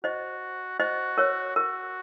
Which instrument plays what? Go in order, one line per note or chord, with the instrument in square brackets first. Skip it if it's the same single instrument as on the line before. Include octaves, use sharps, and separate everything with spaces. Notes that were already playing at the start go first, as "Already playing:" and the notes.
[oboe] F#4 [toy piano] C5 D#5
[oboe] F#4 [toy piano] C5 D#5
[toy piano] A#4 C#5
[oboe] F#4 [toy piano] A#4